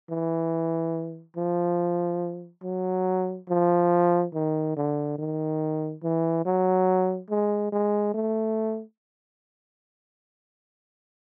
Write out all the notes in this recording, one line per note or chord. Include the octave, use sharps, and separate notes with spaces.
E3
F3
F#3
F3
D#3
D3
D#3
E3
F#3
G#3
G#3
A3